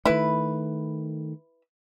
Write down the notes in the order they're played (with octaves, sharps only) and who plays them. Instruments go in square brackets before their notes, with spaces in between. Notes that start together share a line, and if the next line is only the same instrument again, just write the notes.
[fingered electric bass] D#3 A3 [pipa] E4 B4